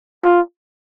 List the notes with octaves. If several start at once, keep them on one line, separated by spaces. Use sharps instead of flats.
F4